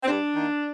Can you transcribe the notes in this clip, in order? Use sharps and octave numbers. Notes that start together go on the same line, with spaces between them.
C4
G2 D4
D#3 A#3